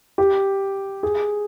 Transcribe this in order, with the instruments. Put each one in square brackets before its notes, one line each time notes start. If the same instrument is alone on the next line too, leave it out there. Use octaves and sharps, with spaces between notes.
[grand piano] G4
G#4